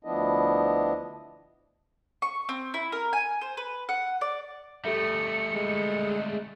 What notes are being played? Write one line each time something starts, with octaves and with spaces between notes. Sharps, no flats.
D2 F3 B3 D4 E4 D#5
C#6
C4
E4
A#4
G#5
C5
B4
F#5
D5
G3 A3 G4 A4 E5 C#7
G#3